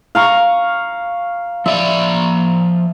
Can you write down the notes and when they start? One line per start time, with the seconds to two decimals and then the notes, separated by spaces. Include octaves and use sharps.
0.15 F5 A#5 C#6
1.66 F3 D5 E5